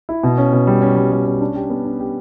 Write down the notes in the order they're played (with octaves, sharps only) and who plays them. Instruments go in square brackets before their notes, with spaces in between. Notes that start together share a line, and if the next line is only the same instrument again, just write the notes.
[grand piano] E4
B2
C#4
B2
G3
C#4
G3
G3
C#4
D4
G4
B3
D4
G4